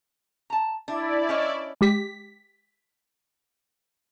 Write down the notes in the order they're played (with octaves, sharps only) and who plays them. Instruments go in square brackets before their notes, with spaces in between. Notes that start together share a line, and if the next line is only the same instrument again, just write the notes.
[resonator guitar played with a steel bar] A5 A#5
[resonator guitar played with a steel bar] D4 [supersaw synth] E4 D5
[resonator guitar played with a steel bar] C#4 C#5 D#5
[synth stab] G#3 G4 B6